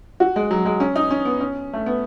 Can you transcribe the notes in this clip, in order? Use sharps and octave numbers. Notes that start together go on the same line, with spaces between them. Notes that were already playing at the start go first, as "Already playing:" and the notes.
F#4
G#3
F#3
G#3
C#4
D#4
C#4
B3
C#4
A3
B3